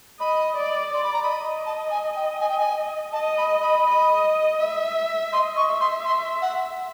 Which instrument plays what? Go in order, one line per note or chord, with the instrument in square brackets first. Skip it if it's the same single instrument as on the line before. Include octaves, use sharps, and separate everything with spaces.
[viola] D#5 [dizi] B5
[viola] D5
[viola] D5 [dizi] C6
[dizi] B5
A#5
B5
[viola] D#5
[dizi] A5
G#5
G5
G#5
G5
G#5
[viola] D#5 [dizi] A5
[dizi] B5
B5
[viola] D#5
E5
[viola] D#5 [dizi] C6
[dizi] C#6
[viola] E5
[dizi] C6
C6
F#5